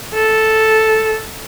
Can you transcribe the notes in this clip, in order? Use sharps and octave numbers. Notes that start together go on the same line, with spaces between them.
A4